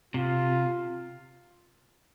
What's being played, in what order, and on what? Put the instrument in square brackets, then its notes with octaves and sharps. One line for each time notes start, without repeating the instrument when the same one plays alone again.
[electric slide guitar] C3 [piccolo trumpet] F4